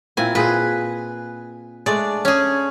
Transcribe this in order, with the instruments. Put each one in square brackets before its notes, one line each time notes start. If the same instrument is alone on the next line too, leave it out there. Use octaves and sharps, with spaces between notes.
[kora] A#2 C4 E4 [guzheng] G#5
[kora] A#2 G#4 C5 [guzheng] B4
[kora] G#3 A3 D4 [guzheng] D5
[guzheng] C#4 G#4